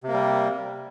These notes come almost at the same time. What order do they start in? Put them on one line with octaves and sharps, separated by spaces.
C3 A#3 G3